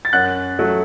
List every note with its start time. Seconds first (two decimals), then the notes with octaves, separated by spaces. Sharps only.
0.05 A6
0.13 F#2 F#5 F#6
0.59 F#3 A3